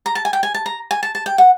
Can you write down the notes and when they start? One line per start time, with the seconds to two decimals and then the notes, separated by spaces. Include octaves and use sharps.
0.06 A#5
0.15 A5
0.25 G#5
0.33 G5
0.43 G#5
0.54 A5
0.66 A#5
0.91 G#5
1.03 A5
1.15 A5
1.26 G5
1.38 F#5